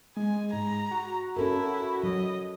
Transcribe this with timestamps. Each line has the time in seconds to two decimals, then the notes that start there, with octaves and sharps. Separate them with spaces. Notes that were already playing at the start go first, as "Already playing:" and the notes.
0.17 G#3 G#5
0.53 G#2 A#5
0.91 F#4
1.37 C#4 E4 A4 A#4
2.04 F#3 D#5